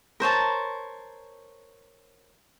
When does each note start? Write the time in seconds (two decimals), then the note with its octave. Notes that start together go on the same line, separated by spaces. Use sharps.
0.20 A#4 C5 C#5 A5